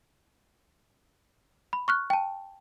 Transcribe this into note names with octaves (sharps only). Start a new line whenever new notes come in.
B5
C#6 F6 F#6
G5 A5